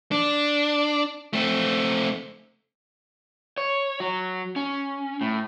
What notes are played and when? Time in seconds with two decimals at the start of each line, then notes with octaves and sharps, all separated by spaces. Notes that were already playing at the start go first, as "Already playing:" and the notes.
0.11 D4
1.33 A3 C4
3.58 C#5
4.00 F#3
4.56 C#4
5.21 A2